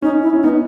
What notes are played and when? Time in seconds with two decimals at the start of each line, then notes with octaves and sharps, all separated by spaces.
0.02 C#4 D#4
0.22 E4
0.33 C#4
0.43 B3 D#4